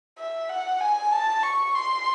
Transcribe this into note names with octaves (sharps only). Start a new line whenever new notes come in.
E5
F#5
G#5
A5
C#6
C6